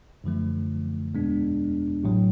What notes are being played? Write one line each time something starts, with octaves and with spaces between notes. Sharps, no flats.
F#2 D3 F3 A3
E2 B2 G#3 B3 D4
A1 A2 F#3